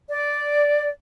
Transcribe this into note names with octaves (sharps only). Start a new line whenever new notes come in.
D5